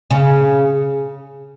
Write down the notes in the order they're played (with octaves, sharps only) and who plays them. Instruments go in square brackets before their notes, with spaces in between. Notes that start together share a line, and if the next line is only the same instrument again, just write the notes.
[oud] C#3